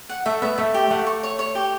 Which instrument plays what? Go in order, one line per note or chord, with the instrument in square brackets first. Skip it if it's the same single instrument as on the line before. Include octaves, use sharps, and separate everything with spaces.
[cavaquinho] F#5
[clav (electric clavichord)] A3 [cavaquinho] E5
[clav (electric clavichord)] B3 [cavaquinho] E5
[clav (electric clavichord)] A3 [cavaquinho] E5
[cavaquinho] G4
[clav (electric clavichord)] A3 [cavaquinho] F#5
[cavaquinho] C#6
C#5
C#5
G4